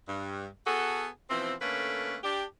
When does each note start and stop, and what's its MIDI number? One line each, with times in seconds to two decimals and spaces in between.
0.08 0.47 43
0.67 1.08 59
0.67 1.08 66
0.67 1.08 68
0.67 1.08 69
1.30 1.54 47
1.30 1.54 52
1.30 1.54 53
1.30 1.54 60
1.62 2.18 50
1.62 2.18 57
1.62 2.18 58
1.62 2.18 61
1.62 2.18 71
2.24 2.45 62
2.24 2.45 67